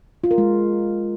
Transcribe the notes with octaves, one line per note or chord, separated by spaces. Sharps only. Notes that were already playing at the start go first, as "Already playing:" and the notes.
F4
A#4
G#3